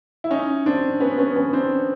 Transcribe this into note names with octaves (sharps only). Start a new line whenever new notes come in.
E4
C#4 D#4
C4 D4
B3 C#4
B3 C#4
B3 C#4
C4 D4